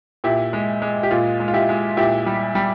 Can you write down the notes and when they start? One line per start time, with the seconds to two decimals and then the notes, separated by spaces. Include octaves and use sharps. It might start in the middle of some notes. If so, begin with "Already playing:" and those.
0.24 A#2 E4 G4
0.53 G#3
0.82 G#3
1.03 G4
1.11 A#2 F4
1.40 G#3
1.48 F4
1.54 E4 G4
1.69 G#3
1.97 A#2 E4 G4
2.26 G3
2.55 G3